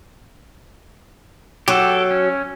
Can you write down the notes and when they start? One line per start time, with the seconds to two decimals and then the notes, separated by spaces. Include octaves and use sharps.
1.68 F#3 G4 A4
2.11 C#4